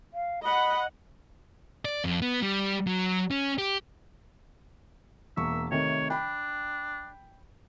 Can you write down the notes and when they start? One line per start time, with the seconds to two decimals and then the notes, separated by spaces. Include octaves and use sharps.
0.14 F5
0.43 D#5 F#5 B5
1.85 D5
2.04 F2
2.21 B3
2.42 G3
2.87 F#3
3.31 C#4
3.58 G4
5.37 E1 A#3 E5 C#6
5.71 C3 D#3 A3 C#5
6.10 D4 G5 B5